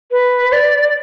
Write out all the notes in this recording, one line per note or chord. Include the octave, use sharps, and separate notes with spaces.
B4
D5